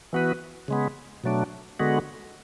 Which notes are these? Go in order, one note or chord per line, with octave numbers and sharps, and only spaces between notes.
E3 B3 F#4 B4
C#3 G#3 B3
B2 F#3 A3 D4
D3 G#3 B3 F#4